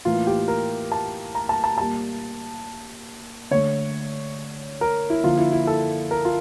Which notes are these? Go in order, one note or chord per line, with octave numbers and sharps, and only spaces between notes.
A2 E3 A#3 F4
G4
A#4
A5
A#5
A5
A5
A#2 G3 A#3 A5
D3 A3 C#5
A#4
E4
D3 F3 A#3 F4
E4
E4
A4
A#4
F4